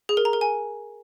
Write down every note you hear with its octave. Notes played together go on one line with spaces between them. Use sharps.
G#4
A#4
A#5
A#4
G#5